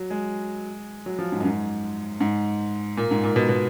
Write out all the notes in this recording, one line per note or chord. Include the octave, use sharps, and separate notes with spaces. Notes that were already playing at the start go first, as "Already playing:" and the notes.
Already playing: F#3
G#3
F#3
F3
G#2
F#2
G#2
G#2
A#2
G#2
A#2
B2
B2